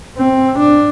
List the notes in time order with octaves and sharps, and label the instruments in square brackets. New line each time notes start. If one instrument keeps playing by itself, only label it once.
[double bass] C4
D4